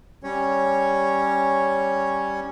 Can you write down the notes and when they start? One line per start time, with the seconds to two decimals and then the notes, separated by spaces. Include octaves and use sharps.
0.23 G3 C#4 C#5